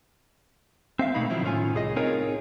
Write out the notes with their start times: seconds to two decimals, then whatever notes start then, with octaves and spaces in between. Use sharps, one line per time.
0.99 C4 E5 F5
1.15 B2 A3 A#3 D#4 B5
1.30 D#3 F3 F#3 C4 E4
1.43 A2 D3 D#3 C#4 F4 G#5
1.73 C2 A2 G#4 D#5
1.96 C4 D#4 F4 G#4 A#4 C#5